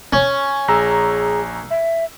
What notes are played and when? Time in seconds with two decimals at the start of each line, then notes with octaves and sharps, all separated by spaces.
0.13 C#4
0.68 A#1 G#4 A#5 E6
1.70 E5